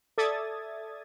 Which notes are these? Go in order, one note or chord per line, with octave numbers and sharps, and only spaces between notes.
A4 D5 E5 D#6 G#6 A6